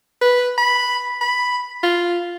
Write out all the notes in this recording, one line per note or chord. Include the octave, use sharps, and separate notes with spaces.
B4
B5
B5
F4